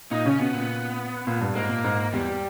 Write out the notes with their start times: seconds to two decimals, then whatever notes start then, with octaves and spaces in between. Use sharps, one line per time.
0.11 A#2 D#4
0.25 C#3 C#4
0.39 B2 B3
0.54 A#2
1.27 A#2
1.41 G2
1.55 G#2 A#3
1.69 A#2
1.84 G#2
2.13 E2 G3